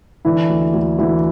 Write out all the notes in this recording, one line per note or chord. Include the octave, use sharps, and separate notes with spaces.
D3 E3 E4
D2
D2
D2 E3 E4